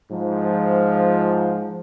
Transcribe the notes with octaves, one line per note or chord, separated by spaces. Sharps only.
G#2 F3